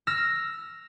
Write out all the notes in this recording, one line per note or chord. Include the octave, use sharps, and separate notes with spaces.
E6 F6 A#6